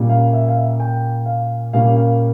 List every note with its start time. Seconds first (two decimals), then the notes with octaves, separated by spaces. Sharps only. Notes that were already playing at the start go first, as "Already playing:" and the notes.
Already playing: A#2 G3 A#3 C#4
0.09 F5
0.33 E5
0.48 F5
0.56 E5
0.80 G5
1.26 F5
1.73 A#2 G3 A#3 C#4 F5
1.96 F5